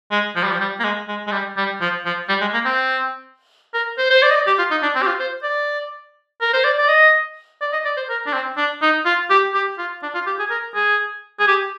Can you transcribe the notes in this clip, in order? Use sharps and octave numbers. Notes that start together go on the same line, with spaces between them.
G#3
F3
G3
F3
G3
A#3
G#3
G#3
G#3
G3
G3
F3
F3
G3
G#3
A#3
C4
A#4
C5
C5
D5
D#5
D5
G4
F4
D#4
D4
C4
G4
F4
C5
D5
A#4
C5
D5
D5
D#5
D5
D#5
D5
C5
A#4
D4
C4
D4
D#4
F4
G4
G4
F4
D4
F4
G4
G#4
A#4
G#4
G#4
G4